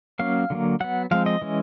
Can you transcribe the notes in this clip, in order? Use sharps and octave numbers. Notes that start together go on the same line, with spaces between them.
F#3 A#3 C#4 F5
D3 F#3 A#3
F#3 B3 F#5
F3 G#3 C4 F5
D#5
E3 G#3 C#4